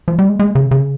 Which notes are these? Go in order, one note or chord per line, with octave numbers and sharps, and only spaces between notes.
F3
G3
G#3
G#3
C#3
C#3